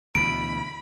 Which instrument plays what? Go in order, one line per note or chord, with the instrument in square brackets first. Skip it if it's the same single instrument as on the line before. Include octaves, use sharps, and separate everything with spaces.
[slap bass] D2 B2 E3 [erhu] B5 [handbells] D7